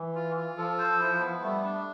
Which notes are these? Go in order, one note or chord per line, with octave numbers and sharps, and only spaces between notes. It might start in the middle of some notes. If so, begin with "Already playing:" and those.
Already playing: E3
F4
F4
F3 A4
C5
E4
B3
G3 A3
D4